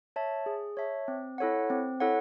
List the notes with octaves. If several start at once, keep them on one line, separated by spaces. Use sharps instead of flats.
C#5 E5 A5
G#4
C#5 E5 A5
C4
E4 A4 C#5 F#5
C4
E4 A4 C#5 F#5